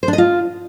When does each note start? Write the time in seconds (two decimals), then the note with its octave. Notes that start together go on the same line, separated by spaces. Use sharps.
0.03 C5
0.08 D4
0.13 D#5
0.18 F4